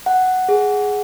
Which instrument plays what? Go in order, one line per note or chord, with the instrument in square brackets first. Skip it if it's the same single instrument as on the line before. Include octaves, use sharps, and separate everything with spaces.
[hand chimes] F#5
G#4